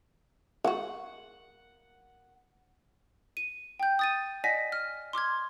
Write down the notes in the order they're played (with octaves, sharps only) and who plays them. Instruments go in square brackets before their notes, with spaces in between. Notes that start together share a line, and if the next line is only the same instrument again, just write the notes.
[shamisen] G#3 F#4 [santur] F#5
[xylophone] D#7
G5 G6
D#6 A6 D#7
D5 D#5 F#5 G#5 A#6 B6
F6
C6 D6 F6 G#6